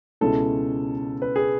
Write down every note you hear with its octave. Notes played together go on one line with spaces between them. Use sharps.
C#2 B2 G#3 C#4 E4 A4
B4
G#4